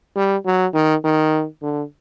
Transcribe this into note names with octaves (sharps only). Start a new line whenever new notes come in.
G3
F#3
D#3
D#3
D3